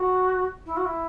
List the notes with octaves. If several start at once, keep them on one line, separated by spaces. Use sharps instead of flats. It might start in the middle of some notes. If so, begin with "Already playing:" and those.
Already playing: F#4
E4
F#4
E4